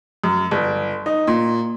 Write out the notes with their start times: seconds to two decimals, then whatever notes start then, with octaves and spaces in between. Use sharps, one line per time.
0.24 F#2
0.51 G1
1.06 D#4
1.27 A#2